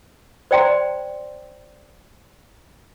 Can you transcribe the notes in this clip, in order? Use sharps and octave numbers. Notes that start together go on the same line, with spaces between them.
C5 D5 G5 A#5 C6